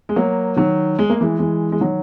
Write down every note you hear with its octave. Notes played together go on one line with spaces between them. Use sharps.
G#3
F#3 A#3
D#3 F#3
G#3
A#3
E3 G#3
E3 G#3
G#3
D#3 F#3